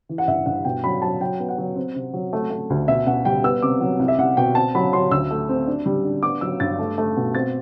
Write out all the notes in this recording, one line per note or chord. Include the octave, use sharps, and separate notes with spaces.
E3
F#5
G2 E5
G2 F#5
B2 G5
F#3 B5
F#3 A5
F#3 G5
B3
F#5
F#3
C4
C3
F#3
A3
A3
D2
B2 E5
B2 F#5
G3 G5
B3 E6
C3 D6
F#3
C2
E5
C2 F#5
B2 G5
C4 A5
F#3 B5
F#3 C6
D2 E6
A3
C4
D4
G3
D4
B3 D6
F#3 E6
G2 A6
A3
A3
B2
C4 A6